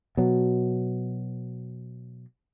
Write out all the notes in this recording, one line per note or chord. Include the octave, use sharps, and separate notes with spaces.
B2 F#3